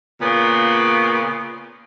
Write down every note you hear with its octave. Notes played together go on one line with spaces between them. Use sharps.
A#2 C#3 B3